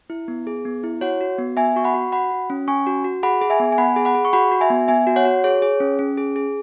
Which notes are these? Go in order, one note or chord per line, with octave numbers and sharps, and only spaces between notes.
E4
B3
G#4
B3
E4
F#4 C#5 F#5
F#4
B3
B3 E5 G#5
F#4 C#6
F#5 B5
F#4
F#4 F#5 B5
F#4
C#4
C#4 G#5 C#6
F#4
F#4
G#4 F#5 B5
G#4
E5 G#5
B3
G#5
B3 F#5 B5
G#4
F#5 B5
G#4
C#6
F#4 F#5 B5
F#4
E5 G#5
B3
B3 E5 G#5
F#4
C#5 F#5
F#4
G#4 C#5
G#4
C#4
C#4
G#4
G#4